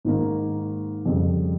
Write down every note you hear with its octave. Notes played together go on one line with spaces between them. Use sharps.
G#2 D#3 A#3
F2 C#3 G3